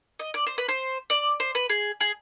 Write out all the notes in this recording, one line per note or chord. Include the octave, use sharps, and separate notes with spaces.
D#5
D5
C5
B4
C5
D5
C5
B4
G#4
G#4